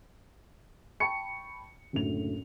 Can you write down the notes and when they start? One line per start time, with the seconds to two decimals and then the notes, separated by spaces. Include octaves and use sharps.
1.00 G5 A5 B5 C#6 C#7
1.93 F#1 D2 A2 F7